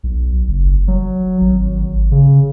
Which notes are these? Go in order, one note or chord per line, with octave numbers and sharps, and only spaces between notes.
B1
F#1
F#3
G#1
C#3